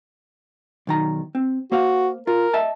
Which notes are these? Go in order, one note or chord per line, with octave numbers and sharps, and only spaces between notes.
B1 D#3 A#5
C4
A#3 F#4 C5 F5
F4 A#4
D#5 E5 A5